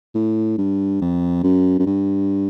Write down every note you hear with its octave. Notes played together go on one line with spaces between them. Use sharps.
A2
G2
F2
F#2
F#2
G2